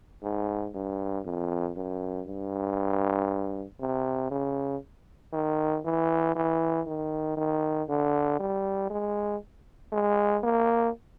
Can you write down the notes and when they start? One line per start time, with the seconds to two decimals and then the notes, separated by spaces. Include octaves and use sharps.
0.23 G#2
0.74 G2
1.25 F2
1.76 F#2
2.27 G2
3.80 C3
4.31 C#3
5.33 D#3
5.85 E3
6.35 E3
6.86 D#3
7.37 D#3
7.89 D3
8.40 G3
8.90 G#3
9.93 G#3
10.44 A#3